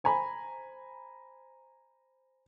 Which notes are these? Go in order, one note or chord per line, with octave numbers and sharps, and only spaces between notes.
C5 G#5 A#5 B5